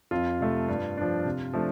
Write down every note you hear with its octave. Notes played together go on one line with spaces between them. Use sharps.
F2 F4
C3 A3
G2
F3 D4
C3
F3 A3 D4